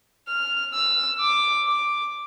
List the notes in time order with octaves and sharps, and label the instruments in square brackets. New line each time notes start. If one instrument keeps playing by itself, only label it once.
[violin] F6
E6
D6
D6